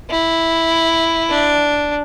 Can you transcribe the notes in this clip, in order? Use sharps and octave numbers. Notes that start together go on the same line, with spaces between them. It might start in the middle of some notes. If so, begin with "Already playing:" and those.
E4
D4